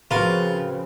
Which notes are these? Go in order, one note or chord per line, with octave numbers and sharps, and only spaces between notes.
C#3 F3 C4 F4 F#4 A#4 B4